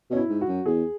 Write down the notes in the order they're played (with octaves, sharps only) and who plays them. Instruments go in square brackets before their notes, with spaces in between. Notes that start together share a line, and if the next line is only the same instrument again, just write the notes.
[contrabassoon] B2 [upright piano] C#4
[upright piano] E4
[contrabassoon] G#2
[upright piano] F#4
[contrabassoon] F#2
[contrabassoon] E2 [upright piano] G#4